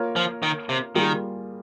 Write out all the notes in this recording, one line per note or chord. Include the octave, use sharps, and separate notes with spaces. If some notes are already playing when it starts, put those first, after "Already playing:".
Already playing: A#3 F4 A#4 C#5
F3
D#3
C3
D#3 G3 A#3 F4 G#4